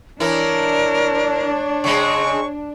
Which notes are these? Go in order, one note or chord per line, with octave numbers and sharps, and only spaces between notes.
E3 D4 E4 A#4 C#5
C#3 G#3 C4 C#6